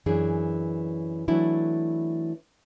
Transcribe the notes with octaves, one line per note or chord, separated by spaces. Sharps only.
F#2 E3 D4 G#4
E3 F#3 A3 D4 E4 F#4